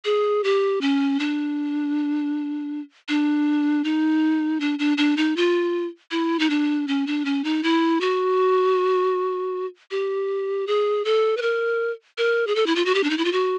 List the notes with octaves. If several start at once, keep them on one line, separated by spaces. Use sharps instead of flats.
G#4
G4
C#4
D4
D4
D#4
D4
D4
D4
D#4
F4
E4
D#4
D4
C#4
D4
C#4
D#4
E4
F#4
G4
G#4
A4
B4
A#4
A#4
G#4
A4
E4
F4
F#4
G4
D4
D#4
E4
F4
F#4